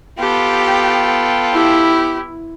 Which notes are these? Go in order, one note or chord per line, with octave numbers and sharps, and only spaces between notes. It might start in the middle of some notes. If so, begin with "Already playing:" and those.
B3 F4 G4 A4 G5
E4 G4